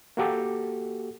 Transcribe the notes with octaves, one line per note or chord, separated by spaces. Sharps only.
A#3 F#4 G4 A4